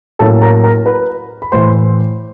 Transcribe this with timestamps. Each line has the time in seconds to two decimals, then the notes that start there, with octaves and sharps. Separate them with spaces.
0.19 A2 F#3 A#3 C#4 A4 A5
0.42 A#4 A#5
0.64 A#4 A#5
0.86 B4 B5
1.42 B5
1.52 A2 E3 A3 C5 C6